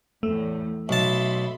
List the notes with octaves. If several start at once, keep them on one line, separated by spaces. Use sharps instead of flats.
E2 A2 A3
B1 E5 A5 B5 C6